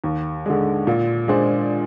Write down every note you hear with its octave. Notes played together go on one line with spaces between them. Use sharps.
D#2
D3 G#3
A#2
G#3 D4 G#4 C5